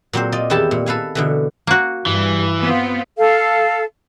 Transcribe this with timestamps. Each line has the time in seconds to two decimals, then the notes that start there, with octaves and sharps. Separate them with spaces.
0.13 A#2 F#3 C4 C5
0.32 F4 D5 D#5
0.50 E2 D#3 E4 G4 A4 A5
0.71 A#2
0.86 A4 B4 F5 G#5
1.15 B2 D3 E3
1.67 A#3 F#4
2.07 G2 E3 G3
2.62 B3 C4 F4
3.18 A4 F5